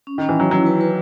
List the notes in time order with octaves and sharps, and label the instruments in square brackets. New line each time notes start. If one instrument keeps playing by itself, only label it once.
[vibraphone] C#4
[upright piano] D#3 [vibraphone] C#4
[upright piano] E3
[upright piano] F#3 [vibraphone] C#4
[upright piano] F#3 [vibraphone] E4
[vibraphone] B4
B4